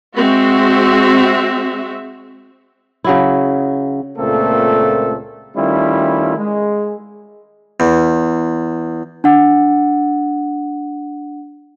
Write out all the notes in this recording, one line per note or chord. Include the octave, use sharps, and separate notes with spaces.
G#3 C4 F#4 E5
C#3 F#3 E4
C#2 A#2 A3 A#3 C4 A4
D#3 G3 A3 C#4 E4 F4
G#3
E2
D4 F#5